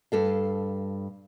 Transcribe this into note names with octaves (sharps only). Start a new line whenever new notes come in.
G2 A4 F5